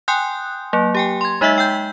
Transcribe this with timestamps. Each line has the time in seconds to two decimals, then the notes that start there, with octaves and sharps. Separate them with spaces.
0.08 G5 G#5 C6 D#6 F#6 G6
0.73 F#3 A#3
0.95 G4 G5 G#5
1.21 C6 G#6
1.41 G#3 D#4 D#5 E5 E6 B6
1.58 G5 E6 G6